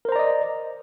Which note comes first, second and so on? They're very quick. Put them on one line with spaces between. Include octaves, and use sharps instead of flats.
A#4 C5 A#5 D5 D#5